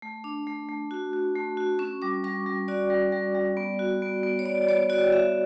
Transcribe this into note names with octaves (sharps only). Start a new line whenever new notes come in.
A3
D4
A3
A3
F#4
F#4
A3
F#4
C#4 C#6
G3 D6
G3 C#6
G3
F#4 D5
G3
G3
G3
B3
F#4
B3
B3
C#5
B3 D5
D5
B3 C#5
F#4 D5
F#4 E5